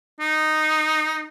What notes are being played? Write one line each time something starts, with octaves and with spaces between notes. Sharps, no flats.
D#4